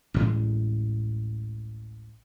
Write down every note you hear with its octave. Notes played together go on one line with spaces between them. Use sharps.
A1 D2 A2 G#3